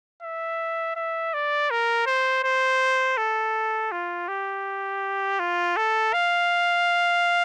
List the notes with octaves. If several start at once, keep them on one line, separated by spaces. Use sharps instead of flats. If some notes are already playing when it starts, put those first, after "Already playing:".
E5
E5
D5
A#4
C5
C5
A4
F4
G4
F4
A4
F5